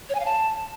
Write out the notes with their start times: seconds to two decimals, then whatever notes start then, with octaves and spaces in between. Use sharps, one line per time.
0.09 C#5
0.15 G#5
0.20 F5
0.25 A5